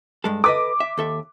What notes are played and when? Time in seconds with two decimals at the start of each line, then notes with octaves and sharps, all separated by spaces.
0.24 G2 G#3 A4
0.44 A4 B4 D#5 D6
0.80 E5
0.98 D#2 A4 E5